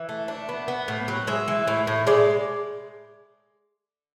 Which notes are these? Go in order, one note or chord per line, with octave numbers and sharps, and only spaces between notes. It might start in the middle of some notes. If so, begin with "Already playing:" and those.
Already playing: E3
A3
D4
B3
B3
A2
F#3
G#3 E5
E3
A2
A2
G#3 D5